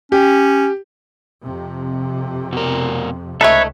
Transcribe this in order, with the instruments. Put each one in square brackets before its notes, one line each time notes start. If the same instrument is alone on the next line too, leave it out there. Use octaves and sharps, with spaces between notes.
[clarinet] C#4 [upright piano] G4
[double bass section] F2 C3
[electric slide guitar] B2 A#4
[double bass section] C#2 [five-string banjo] A3 D#4 [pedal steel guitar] A4 B4 C#5 [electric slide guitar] E5